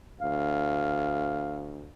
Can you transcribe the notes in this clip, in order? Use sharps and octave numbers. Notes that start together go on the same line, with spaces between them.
D2 F5